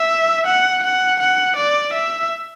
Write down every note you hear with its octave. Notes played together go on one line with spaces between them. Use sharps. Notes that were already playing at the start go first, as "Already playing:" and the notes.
Already playing: E5
F#5
F#5
F#5
D5
E5